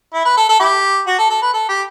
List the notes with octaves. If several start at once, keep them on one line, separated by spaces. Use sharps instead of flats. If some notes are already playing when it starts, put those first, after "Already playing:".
E4
B4
A4
A4
E4 G4
F#4
A4
A4
B4
A4
G4